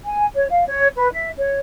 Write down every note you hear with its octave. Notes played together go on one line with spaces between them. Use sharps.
G#5
C#5
F5
C#5
B4
E5
C#5